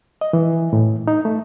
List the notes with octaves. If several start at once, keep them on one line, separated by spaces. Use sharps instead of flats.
D#5
E3
A2
D#4
A3